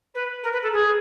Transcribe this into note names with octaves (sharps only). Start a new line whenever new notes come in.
B4
A#4
B4
A4
G#4